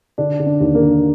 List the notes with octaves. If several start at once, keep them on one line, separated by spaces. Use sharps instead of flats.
D3 D4
D3
D4
D#2
A#3
D3